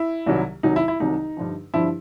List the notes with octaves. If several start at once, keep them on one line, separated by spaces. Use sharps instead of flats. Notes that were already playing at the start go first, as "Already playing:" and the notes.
Already playing: E4
C2 C3 D#3 F#3
C2 C3 D#3 F#3 D#4
E4
E4
C2 C3 D#3 F#3 D#4
G2 D3 F3
G2 D3 F3 E4